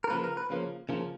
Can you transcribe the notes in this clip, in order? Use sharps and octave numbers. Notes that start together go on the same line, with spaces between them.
A#4
C#3 F3 A#3 B4
A#4
B4
C#3 F3 A#3
C#3 F3 A#3